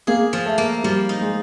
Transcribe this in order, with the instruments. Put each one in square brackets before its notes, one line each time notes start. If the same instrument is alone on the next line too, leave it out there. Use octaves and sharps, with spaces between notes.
[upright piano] A#3 [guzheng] G#4
[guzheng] F3
[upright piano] A3
[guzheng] A#3
[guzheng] F3 [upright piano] G3
[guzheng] D#4
[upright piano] G#3